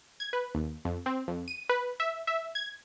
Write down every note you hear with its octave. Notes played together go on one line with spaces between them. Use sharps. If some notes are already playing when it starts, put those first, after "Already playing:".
G#6
B4
D#2
F2
C4
F2
D#7
B4
E5
E5
G#6